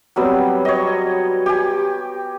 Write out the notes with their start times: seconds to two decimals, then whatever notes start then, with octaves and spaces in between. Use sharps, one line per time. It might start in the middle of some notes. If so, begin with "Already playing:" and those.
0.16 F#3 G3 B3 C4
0.65 C#5 D#5
1.46 G4 G#5